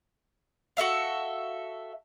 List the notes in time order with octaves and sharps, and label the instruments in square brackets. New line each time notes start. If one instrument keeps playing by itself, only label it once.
[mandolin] F#4 A4 E5 F5